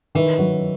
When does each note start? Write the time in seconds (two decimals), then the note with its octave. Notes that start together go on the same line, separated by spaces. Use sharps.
0.15 D#3 E3
0.38 F#3